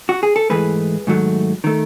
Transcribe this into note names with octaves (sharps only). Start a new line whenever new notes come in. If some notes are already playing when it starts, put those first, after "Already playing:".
F#4
G#4
A4
G#2 E3 A3 G#4 B4
G#2 D#3 F#3 A3
D#3 A3